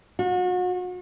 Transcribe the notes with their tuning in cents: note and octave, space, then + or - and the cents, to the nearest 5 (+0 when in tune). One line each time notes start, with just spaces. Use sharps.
F#4 -35